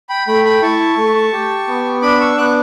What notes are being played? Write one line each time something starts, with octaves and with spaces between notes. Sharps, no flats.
G5 B5
A3 G5 B5
G5 B5
E4 A5 C#6
A3
G4
B3
D4 B5 D6
C#6 E6
B3 D6 F#6